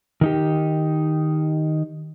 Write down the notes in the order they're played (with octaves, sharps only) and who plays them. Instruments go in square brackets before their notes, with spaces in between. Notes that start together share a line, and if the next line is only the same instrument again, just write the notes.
[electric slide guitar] D#3 D#4 G4